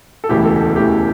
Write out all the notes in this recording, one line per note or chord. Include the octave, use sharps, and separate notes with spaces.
A4
E1 D2 C#3 E3 G4
A4
A4
E1 D2 C#3 E3 G4